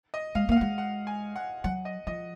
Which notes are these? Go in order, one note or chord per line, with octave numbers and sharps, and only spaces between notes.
D#5
G#3 F5
A#3 F5
F#5
G#3
F#5
G#5
F#5
F#3 F#5
D#5
F3 D#5